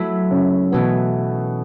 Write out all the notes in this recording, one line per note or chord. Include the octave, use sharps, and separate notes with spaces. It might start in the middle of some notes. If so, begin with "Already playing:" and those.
Already playing: F#3 A3 E4 B4
C#3 C#4
B2 E3 A3 B3 C#4